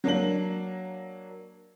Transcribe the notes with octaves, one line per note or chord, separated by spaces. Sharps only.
F#3 A#3 D4 F#7